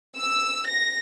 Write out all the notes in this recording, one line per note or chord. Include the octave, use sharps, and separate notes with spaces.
E6
A#6